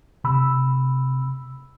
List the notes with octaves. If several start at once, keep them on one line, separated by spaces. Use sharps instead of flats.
C3 B5 E6